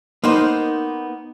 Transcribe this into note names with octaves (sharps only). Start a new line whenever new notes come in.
A#3 B3 D#4 C5